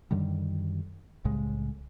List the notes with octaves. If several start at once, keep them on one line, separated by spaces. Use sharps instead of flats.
F#2 D3 D#3 G3
C2 A2 C#3 G#3